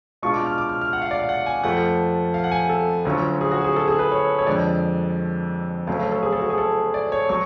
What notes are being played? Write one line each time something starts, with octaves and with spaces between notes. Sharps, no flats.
B2 G#3 D4 F4 C#6
D6
F6
D6
F6
F6
F#5
F5
D5
F5
F#5
G#5
F2 F3 A3 F#5
F5
F#5
G#5
A4
D2 D3 F#3 C#4 F4
G#4
F#4
G#4
A4
G#4
B4
C#5
C#5
F2 D3 G#3 D5
D2 C#3 F#3 A3 C#4 F5
F5
A4
G#4
A4
F#4
G#4
A4
D5
C#5
F#3 C#6